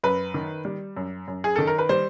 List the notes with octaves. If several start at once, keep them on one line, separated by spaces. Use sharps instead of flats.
F#2 B4
D#3
G3
F#2
F#2
G#4
D#3 A4
A#4
B4
G3 C5